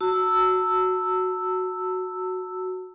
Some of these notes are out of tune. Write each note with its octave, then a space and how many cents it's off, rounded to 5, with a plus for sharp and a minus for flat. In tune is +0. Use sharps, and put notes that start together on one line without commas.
F#4 -5 A5 +35 E6 +0